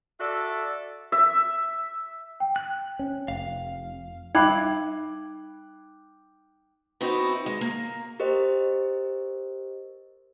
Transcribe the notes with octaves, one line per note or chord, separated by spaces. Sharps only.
F#4 A4 D5 E5
E5
G5
F#6
C#4
F1 F5
G3 D#4 E5 F5 G5 B5 D6 F#6
B3 C4 D#4 E4 F#4
G#3
A#3
G4 A#4 C5 D#5